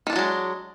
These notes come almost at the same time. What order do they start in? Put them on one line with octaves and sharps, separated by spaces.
D#3 D4 F3 F#3 G#3